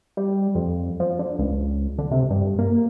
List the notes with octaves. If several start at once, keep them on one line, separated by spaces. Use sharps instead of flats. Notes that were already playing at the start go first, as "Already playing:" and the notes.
G3
F2
F3
D3
C#2
D3
C3
G2
A#3